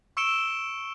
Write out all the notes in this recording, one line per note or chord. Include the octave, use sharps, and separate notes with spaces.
C#6 E6 C#7 D7 E7 G7